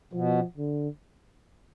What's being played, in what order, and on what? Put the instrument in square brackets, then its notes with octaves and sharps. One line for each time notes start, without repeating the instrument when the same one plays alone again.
[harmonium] B2 [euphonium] F3
[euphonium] D3